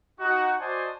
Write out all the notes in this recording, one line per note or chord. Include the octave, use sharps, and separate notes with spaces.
D#4 F#4
F#4 C5 D5 D#5 G#5 A5